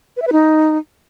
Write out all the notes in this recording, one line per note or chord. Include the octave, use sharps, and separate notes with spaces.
B4
E5
B4
D#4